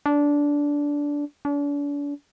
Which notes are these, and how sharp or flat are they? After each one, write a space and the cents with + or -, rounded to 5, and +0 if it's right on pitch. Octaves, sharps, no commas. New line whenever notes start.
D4 -15
D4 -40